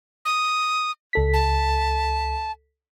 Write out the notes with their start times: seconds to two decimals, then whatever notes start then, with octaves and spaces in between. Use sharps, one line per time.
0.25 D#6
1.13 C#2 A4 B6
1.33 A5